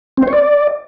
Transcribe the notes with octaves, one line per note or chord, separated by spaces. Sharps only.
C4
C5
C#5
D5